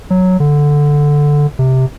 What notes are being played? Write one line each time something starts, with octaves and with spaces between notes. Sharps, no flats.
F#3
D3
C3